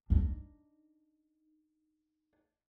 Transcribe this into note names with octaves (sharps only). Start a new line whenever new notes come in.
D4 D#4